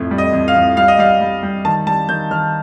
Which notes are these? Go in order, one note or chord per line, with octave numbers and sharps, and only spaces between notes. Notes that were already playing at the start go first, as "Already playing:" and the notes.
Already playing: F2 A2
G3
D#5
F2
F5
F2
G3 F5
D#5
G3 F5
G3
G3
D#3 A5
G3 A5
D#3 G6
D#3 F6